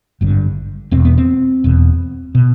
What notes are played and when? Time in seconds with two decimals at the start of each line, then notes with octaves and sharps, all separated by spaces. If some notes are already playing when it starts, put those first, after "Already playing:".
0.21 G#1 G2 D3
0.91 E1 E2 B2 C4
1.05 B3
1.18 C4
1.64 E1 E2 B2
2.35 B2